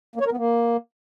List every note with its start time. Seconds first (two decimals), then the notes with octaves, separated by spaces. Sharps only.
0.16 A#3
0.21 C#5
0.26 A#4
0.32 B3
0.37 A#3